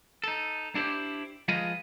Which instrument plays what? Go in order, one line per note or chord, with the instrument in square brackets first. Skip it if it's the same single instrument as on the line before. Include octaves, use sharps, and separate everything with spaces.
[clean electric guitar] D#4 A4
D4 E4 G4 B4 C5 D5
F3 G#3 F4 G#4 B4 D#5